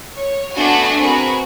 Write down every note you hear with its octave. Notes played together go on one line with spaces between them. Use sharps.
C#5
A3 B3 D4 F#4 F#5 G#5
C4 F#4 G#4 A#4 B4